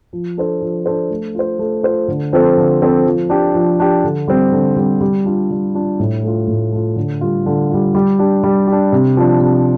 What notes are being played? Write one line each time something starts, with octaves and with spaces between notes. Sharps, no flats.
F3
D4 A4 C5
F3
D4 A4 C5
A3
F4 C5
A3
F4 C5
D3
F3 C4 A4 C5
D3
F3 C4 A4 C5
F3
D4 G4
F3
D4 G4
D3
G3 C4
D3
G3 C4
G3
D4 F4
G3
D4 F4
A2
A3 F4
A2
A3 F4
D3
G3 F4
D3
G3 F4
G3
D4 G4
G3
D4 G4
C3
F3 D4
C3